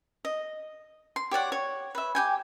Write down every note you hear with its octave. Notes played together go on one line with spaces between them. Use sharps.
D#5
C6
G4 C#5 D5 F#5
C#5
B4 E5
G4 G5 G#5